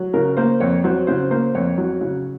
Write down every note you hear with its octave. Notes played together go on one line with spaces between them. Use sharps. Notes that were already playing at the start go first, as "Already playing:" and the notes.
Already playing: F#3
C#3 A#4
A#3 C5
F2 C#5
F#3 C5
C#3 C5
A#3 C5
F2 C#5
F#3
C#3